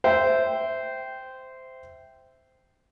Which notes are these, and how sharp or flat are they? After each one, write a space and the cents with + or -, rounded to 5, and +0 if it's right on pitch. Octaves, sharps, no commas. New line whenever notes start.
C5 -10 E5 +0 G5 -5